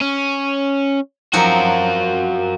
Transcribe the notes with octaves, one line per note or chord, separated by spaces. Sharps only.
C#4
F3 F#3 C4 F#4 A#4